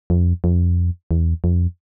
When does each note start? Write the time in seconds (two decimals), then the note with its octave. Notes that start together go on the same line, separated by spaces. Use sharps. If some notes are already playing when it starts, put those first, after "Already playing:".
0.10 F2
0.44 F2
1.11 E2
1.44 F2